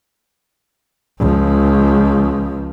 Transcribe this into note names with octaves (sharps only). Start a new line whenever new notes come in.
C#2 F3